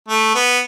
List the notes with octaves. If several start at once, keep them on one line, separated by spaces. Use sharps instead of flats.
A3
B3